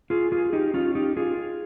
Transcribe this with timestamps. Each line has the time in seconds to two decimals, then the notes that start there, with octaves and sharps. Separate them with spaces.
0.10 F4 G#4
0.32 F4 G#4
0.53 D#4 G4
0.74 C#4 F4
0.95 D#4 G4
1.17 F4 G#4